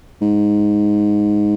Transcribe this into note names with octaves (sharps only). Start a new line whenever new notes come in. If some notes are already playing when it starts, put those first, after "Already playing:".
G#2